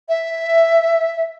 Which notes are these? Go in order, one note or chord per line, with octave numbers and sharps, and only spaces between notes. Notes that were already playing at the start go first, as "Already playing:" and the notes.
E5